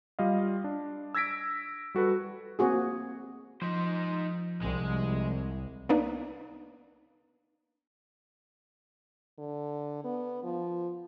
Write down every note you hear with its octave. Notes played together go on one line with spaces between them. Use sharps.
G3 F4 D#5 F5
D4
E6 G#6 A#6 B6 D7
G3 F#4 A4 B4
A#3 C4 F#4 G#4
F3 D#4 C5
C2 G#3
A#3 B3 D4 D#4
D3
B3
F3